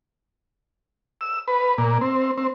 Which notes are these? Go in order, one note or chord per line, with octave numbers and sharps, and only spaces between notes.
E6
B4
A#2
C4
C4